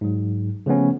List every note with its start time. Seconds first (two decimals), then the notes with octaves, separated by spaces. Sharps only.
0.01 G#2 F#3
0.66 C#3 F3 A3 B3 C#4